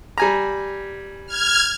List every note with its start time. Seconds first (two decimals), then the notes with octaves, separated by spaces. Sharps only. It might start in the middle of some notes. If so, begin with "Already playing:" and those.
0.18 G3 G#5 A#5
1.26 F6 G#6